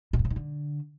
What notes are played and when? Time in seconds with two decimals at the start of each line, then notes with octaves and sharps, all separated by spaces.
0.13 B2
0.19 G2
0.25 C#3
0.30 D#3
0.36 D3